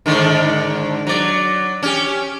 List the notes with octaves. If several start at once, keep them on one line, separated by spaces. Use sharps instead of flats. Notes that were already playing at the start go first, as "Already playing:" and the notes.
G#2 D3 D#3
F#3 D5
C#4 G4